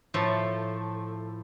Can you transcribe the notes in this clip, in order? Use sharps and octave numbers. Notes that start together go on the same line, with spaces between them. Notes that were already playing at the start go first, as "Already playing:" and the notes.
A2 F3 A3